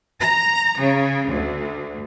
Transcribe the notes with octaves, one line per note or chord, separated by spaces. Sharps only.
A#5
C#3
D2